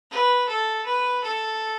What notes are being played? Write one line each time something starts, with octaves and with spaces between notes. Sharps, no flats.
B4
A4
B4
A4